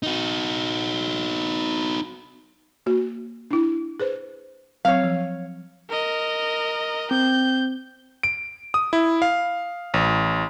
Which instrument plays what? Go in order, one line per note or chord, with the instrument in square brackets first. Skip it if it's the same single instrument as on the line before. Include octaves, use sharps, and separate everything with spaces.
[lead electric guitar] D#4 F#4
[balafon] A#3 F#4
D4 E4
G#4 B4 C5
[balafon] F#3 C4 [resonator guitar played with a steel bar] C#5 F5
[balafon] F3
[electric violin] A#4 D#5
[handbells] C4 [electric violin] G6
[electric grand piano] D7
D#6
E4
F5
A1